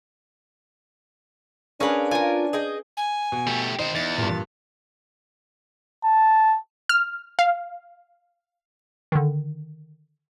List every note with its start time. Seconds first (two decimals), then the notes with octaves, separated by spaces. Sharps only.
1.80 C#4 D4 G#4 A#4 B4 F5
2.11 F4 A#4 G#5
2.53 G#4 D#5 G5
2.97 G#5
3.32 B2
3.47 A3 G4
3.79 D#3 D#4 C5
3.95 E2 A6
4.18 G2 A#2
6.04 A5
6.89 F6
7.39 F5
9.12 D3 D#3